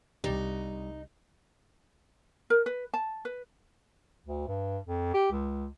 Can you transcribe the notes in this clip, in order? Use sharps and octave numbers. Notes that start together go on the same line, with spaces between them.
C2 G3 D#4
A#4
B4
A5
B4
D2
G2
F2
G4
C#2